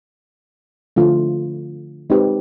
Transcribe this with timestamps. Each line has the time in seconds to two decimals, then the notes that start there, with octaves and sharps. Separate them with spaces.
0.96 D3 F3 A3 D4 F4
2.10 G#3 C4 D#4 G4 B4